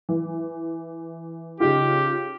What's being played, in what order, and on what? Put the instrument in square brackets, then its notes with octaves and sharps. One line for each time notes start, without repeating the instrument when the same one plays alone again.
[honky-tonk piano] E3
[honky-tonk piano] C#3 D#4 F4 [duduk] G4